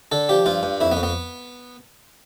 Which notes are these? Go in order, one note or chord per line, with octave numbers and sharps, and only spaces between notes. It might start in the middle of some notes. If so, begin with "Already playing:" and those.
D3 A4
F3 G4
G2 F4
G2
F2 E4
B3
F2
B3